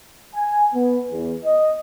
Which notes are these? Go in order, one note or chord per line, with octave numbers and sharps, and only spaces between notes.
G#5
B3
E2
D#5